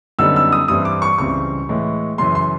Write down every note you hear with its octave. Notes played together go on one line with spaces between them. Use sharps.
F#2 D3 G3 B3 D#4 E6
E6
D#6
G2 E3 G3 C4 E4 D#6
D6
C#6
C#2 C#3 E3 G3 C4 C#6
A2 E3 G#3
F#2 C#3 E3 C6
C6